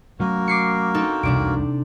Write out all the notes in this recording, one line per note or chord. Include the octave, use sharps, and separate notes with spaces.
F#3 A3 A#3 C#4 F#4 A#4
D6 C7 C#7
C4 D#4 A4
E1 C2 F2 C3 D4 D7